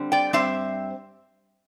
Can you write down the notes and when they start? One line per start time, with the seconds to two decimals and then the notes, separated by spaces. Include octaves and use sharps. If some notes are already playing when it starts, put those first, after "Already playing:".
Already playing: D3 G3 C4
0.12 D5 G5
0.33 G2 G3 C4 C5 E5